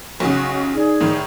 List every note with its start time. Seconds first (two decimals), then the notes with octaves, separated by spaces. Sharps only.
0.20 B1 C#3 F#4
0.75 D#4 G#4 D5
1.01 A2 D#3